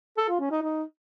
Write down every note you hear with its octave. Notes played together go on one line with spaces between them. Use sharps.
A4
F4
C#4
D#4
D#4